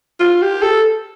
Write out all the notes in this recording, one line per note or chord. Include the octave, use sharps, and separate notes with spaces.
F4
G4
A4